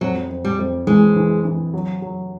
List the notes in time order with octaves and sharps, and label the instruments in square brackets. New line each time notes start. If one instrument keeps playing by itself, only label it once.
[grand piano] F2 [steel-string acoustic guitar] F#3
[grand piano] F2
[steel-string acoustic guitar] G3
[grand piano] F2
[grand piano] E3 [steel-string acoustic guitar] G#3
[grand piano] E3
E3
F#3
F#3